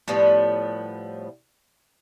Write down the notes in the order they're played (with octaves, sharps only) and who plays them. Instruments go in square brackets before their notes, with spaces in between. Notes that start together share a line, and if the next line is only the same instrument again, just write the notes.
[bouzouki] A2 F3 G3 B3